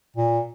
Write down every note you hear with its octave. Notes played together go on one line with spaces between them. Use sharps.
A#2